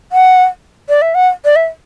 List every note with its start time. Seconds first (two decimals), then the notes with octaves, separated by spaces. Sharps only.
0.12 F#5
0.89 D5
1.02 E5
1.15 F#5
1.45 D5
1.56 E5